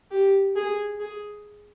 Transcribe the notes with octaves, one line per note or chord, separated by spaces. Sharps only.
G4
G#4
G#4